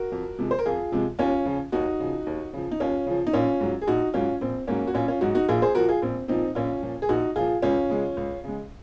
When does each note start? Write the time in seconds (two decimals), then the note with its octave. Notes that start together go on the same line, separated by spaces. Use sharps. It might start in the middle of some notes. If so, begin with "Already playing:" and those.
Already playing: F#4 A#4
0.12 F2
0.38 C3 F3 G#3
0.51 C5
0.59 A#4
0.66 F2 F4 G#4
0.92 C3 F3 G#3
1.19 D#2 C#4 F4
1.46 C#3 F3
1.72 D#2 D#4 F#4
2.00 C#3 F3
2.27 D#2
2.53 C#3 F3
2.71 D#4
2.80 D#2 C#4 F4
3.06 C#3 F3
3.27 D#4
3.33 A#1 C#4 F4
3.60 G#2 F#3
3.82 G#4
3.87 A#1 D#4 F#4
4.14 G#2 F#3 C#4 F4
4.41 A#1 C4
4.67 G#2 F#3 A#3 C#4
4.87 F#4
4.94 A#1 C#4 F4
5.08 C#4 F4
5.21 G#2 F#3 D#4 F#4
5.35 D#4 F#4
5.48 A#1 F4 G#4
5.62 G#4 C5
5.75 A#2 F3 F#4 A#4
5.89 F4 G#4
6.02 A#1 C4
6.28 A#2 F3 C4 D#4
6.55 A#1 C#4 F4
6.83 A#2 F3
7.02 G#4
7.09 A#1 D#4 F#4
7.36 A#2 F3 F4 G#4
7.62 C#2 C#4 F4
7.90 C#3 G#3
8.17 C#2
8.44 C#3 G#3